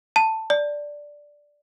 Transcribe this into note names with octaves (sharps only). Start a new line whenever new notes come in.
A5
D5